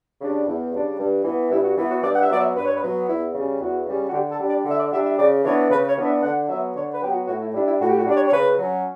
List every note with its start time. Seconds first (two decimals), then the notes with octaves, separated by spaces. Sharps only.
0.20 C#3 G3 D4
0.46 E2
0.72 C#3 G3 D4
0.98 G2
1.24 E3 B3
1.50 G2 E4
1.63 F#4
1.77 E3 B3 E4
1.89 F#4
2.03 G2 D5
2.13 F#5
2.20 E5
2.29 F#3 B3 D5
2.38 E5
2.55 G2 B4
2.65 C#5
2.75 B4
2.81 F#3 B3
3.07 E2 E4
3.34 C#3 G3 C#4
3.59 E2 F#4
3.86 C#3 G3 C#4
4.08 F#4
4.12 D3 G4
4.30 A4
4.38 G3 D4
4.47 D5
4.64 D3 E5
4.78 D5
4.91 G3 D4 E5
5.04 E5
5.17 C#3 D5
5.43 E3 B3 D4 C#5
5.69 C#3 B4
5.87 C#5
5.96 E3 B3 D4
6.05 E5
6.22 D3 F#5
6.48 F#3 B3 E5
6.75 D3 C#5
6.92 B4
7.01 F#3 B3 G4
7.09 F#4
7.26 A2 F#4
7.40 E4
7.52 G3 D4 E4
7.66 E4
7.79 A2 F#4
7.88 G4
7.97 F#4
8.05 G3 D4 D5
8.14 C#5
8.27 C#5
8.31 C#3 B4
8.57 F#3 C#4